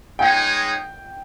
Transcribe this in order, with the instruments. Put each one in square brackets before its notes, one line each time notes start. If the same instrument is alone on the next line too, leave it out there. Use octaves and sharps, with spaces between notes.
[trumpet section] G#3 D#4 G#4 C#5 [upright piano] G5